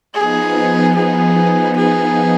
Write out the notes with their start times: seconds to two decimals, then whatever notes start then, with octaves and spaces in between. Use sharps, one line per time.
0.14 F3 B3 D#4 G#4
0.95 G#4
1.76 G#4